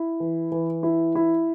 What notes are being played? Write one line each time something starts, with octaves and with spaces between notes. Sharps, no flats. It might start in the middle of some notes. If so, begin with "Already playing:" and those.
Already playing: E4
E3
E3
E4
E4